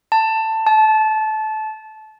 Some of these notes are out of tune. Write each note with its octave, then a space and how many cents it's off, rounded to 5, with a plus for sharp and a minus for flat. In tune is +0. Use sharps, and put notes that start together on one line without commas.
A5 +15
A5 -20